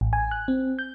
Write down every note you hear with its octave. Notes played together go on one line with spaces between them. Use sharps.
A1
G#5
F#6
C4
G6